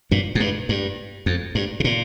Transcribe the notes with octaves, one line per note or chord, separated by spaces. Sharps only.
G2 A#2
G#2
G2
G2
F2
G2
C3
A#2